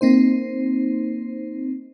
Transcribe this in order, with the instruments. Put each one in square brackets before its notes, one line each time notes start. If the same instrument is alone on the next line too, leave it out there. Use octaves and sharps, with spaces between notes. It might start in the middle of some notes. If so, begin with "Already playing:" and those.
[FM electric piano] A#3 C4 D#4 C5